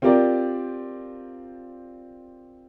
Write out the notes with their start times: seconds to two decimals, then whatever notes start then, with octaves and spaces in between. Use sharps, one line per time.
0.02 C4 F4 G4 A#4 D5